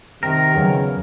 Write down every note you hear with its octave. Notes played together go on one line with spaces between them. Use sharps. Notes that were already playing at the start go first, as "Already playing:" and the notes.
C3 D#3 A#4 G5
E2 C#3 F#3